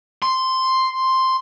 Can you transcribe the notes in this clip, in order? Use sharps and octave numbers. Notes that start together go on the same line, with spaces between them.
C6